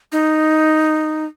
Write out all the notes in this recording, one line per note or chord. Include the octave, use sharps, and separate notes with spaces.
D#4